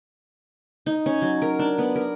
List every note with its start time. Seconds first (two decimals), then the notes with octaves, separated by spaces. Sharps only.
0.86 D#4
1.06 C#4
1.22 F#3
1.42 A#4
1.59 D4
1.78 B3
1.95 A#4